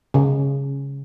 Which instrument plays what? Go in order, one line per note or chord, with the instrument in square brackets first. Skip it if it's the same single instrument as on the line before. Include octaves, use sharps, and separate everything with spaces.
[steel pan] C#3